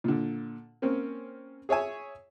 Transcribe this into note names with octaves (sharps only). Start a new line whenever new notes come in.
A#2 D3
A#3 C4 C#4
G#4 C#5 E5 G#5